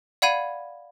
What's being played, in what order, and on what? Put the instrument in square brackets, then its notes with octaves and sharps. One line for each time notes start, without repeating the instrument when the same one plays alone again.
[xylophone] D5 F5 F#5 B5 G#6 D#7